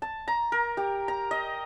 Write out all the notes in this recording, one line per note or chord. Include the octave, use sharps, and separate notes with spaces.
A5
A#5
A#4
G4
A#5
D#5